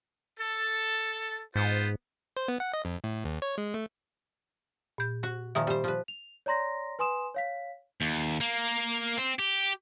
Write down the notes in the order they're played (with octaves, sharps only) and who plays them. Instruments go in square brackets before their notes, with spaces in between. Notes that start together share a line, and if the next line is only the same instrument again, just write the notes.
[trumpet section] A4
[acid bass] G#2 [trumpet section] B3 F4 C5
[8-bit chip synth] C5
B3
F#5
D#5
F2
A2
D#2
C#5
G#3
A3
[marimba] A#2 G6
[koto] F#4
[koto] A#2 D#3 F3 [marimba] E5 D#6
[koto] G3 C5
F3 B4
[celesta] F7
C#5 D5 A#5 C6 A#6
B4 G#5 C6 D#6 E7
C#5 F5 B6
[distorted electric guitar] D#2
A#3
C4
G4